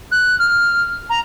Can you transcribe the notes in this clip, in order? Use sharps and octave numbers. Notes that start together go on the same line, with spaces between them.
F#6
F6
A#5